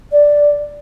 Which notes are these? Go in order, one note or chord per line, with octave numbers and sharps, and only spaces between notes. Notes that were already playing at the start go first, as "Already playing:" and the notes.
D5